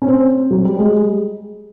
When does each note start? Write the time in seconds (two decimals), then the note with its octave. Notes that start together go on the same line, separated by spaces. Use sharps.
0.02 C#4
0.07 C4
0.51 F#3
0.65 G3
0.79 G#3